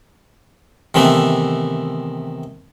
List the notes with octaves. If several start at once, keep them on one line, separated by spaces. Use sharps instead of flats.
C3 D#3 E3 A3 B3